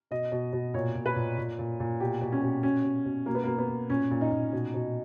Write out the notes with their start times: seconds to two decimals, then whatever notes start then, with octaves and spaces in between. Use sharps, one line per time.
0.11 B2 D#5
0.32 B2
0.53 B2
0.74 A#2 C#5
0.95 A#2
1.06 B4
1.16 A#2
1.38 A#2
1.59 A#2
1.80 A#2
2.00 B2 G4
2.22 B2
2.32 C#4
2.42 B2
2.63 B2 C#4
2.84 B2
3.06 B2
3.26 B2 A#3
3.35 B3
3.44 A#3
3.48 B2
3.58 B3
3.69 B2
3.90 A#2 C#4
4.11 A#2
4.21 D#4
4.32 A#2
4.53 B2
4.74 B2